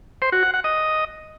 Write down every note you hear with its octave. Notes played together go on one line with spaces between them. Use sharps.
C5
F#4
F#5
F#5
D#5